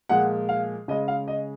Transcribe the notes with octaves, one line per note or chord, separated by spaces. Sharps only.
A#2 F3 G#3 F#5
F5
C#3 G#3 D#5
F5
D#5